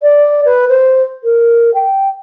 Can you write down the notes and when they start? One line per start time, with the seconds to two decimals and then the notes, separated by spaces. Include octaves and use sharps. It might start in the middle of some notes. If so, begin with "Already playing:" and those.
0.02 D5
0.45 B4
0.69 C5
1.23 A#4
1.74 G5